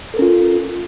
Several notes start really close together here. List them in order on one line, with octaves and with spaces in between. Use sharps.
A4 A#4 C#4 F4